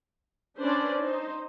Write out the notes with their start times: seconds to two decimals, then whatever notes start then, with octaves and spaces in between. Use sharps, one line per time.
0.59 C#4 D4 B4 C5 D5
1.01 D#4 C5